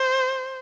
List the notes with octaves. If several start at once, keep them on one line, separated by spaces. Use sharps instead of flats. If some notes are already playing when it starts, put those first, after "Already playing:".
Already playing: C5